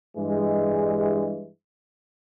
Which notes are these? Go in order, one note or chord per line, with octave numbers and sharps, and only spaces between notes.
G2 E3 G#3